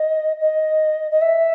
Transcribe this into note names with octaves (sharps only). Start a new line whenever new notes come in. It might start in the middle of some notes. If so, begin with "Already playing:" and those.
Already playing: D#5
D#5
D#5
E5